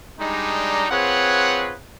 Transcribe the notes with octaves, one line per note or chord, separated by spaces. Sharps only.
G3 G#3 D4 D#4
C4 F4 G#4 B4 C#5 F#5